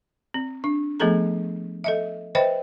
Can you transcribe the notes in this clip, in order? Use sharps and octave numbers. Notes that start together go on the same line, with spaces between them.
C4
D4
F3 A3 B3 G#4 A4 A#5
A4 D#5 E5
B4 C5 D#5 E5 G5 B5